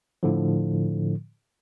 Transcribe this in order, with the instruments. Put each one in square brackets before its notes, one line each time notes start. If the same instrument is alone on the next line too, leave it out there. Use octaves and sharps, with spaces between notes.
[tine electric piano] A2 D3 F3